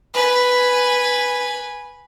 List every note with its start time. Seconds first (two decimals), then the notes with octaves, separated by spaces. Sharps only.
0.14 B4 G#5